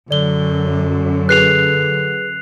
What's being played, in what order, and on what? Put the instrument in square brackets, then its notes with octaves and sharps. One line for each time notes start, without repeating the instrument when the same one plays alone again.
[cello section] F#2 [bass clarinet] D3 [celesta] D5 G7
[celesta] G#4 B4 [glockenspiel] F#6 C7 F7